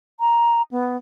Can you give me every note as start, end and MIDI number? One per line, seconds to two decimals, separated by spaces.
0.20 0.62 82
0.71 0.97 59